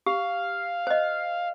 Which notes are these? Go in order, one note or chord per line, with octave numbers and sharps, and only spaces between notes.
G4 F5
C5 D#5